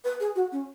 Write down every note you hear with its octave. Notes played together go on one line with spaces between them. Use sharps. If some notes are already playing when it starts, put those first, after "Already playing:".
B4
G#4
F#4
C#4